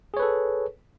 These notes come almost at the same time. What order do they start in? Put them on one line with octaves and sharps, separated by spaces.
G#4 C#5 B4 A4